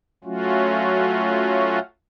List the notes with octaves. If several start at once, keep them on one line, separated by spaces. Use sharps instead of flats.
F#3 A3 C#4 F4 F#4